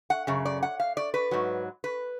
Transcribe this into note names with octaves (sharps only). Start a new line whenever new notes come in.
F#5
F#2 C#3
D5
F#5
F5
D5
B4
G#2 F#3
B4